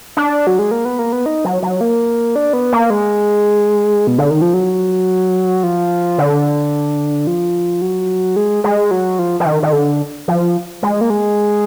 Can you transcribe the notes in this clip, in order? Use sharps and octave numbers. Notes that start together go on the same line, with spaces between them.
D4
F#3
G#3
A#3
B3
A#3
B3
D#4
F#3
F#3
A#3
D4
B3
A#3
G#3
B2
D3
D#3
F3
F#3
F3
D3
F3
F#3
G#3
G#3
F#3
F3
F3
D#3
D#3
D3
F3
G#3
A#3
G#3